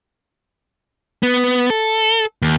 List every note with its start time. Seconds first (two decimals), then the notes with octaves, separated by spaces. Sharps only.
1.23 B3
1.70 A4
2.42 D#2